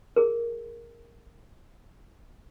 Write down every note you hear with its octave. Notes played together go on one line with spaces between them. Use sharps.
G#4 A#4